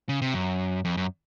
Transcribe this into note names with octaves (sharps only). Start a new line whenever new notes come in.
C#3
C3
F#2
F2
F#2